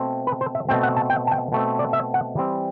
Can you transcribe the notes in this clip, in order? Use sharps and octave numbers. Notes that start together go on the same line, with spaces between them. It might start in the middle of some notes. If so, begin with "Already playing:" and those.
Already playing: B2 A3 C4
B4
C5
E5
B2 A3 C4 G5
F#5
A5
G5
A5
G5
B2 A3 C4
D5
E5
F#5
E3 G3 C4